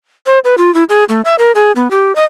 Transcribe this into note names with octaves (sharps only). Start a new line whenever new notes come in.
C5
B4
F4
E4
G#4
A3
E5
A#4
G#4
B3
G4
D#5